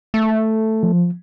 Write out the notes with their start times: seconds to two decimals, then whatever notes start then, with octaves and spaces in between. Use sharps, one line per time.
0.14 A3
0.83 F3